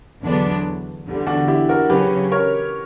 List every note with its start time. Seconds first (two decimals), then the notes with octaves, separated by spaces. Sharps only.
0.22 E2 D3 F#3 B3 D4
1.06 E2 D3 G3
1.27 D4 F#4
1.48 E4 G4
1.69 F#4 A#4
1.89 C#3 F#3 C#4 G4 B4
2.32 A#4 C#5